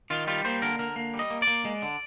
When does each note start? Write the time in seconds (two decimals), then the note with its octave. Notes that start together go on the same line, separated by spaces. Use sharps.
0.10 D#3 F4
0.27 G3 F4
0.45 A#3 C5
0.62 D3 A#4
0.79 D3 A#4
0.96 A#3
1.14 G3
1.19 D#5
1.30 A#3
1.42 D5
1.47 A#3
1.65 G#3
1.82 D3